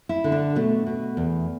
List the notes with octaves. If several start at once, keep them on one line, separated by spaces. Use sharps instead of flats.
E4
D3
D4
B2 A3
B2
E2